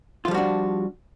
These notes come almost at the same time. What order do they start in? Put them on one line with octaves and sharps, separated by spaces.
F4 F3 G3 F#4 D4